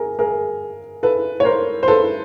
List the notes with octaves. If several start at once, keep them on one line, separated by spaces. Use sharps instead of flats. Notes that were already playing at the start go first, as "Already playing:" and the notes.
Already playing: G#4 A#4
G#4 A#4
A4 B4
C#5
A#4 C5
C5
A4 B4